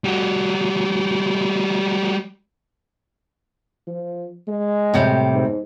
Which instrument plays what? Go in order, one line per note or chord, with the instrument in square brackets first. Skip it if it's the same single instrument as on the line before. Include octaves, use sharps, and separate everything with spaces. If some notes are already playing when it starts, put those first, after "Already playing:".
[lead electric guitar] G3 F#4
[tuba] F3
G#3
[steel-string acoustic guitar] A2 C3 G3
[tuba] G#2